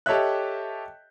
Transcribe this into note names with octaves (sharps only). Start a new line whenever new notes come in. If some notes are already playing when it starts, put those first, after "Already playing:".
G4 A4 C#5 D#5 E5 F#6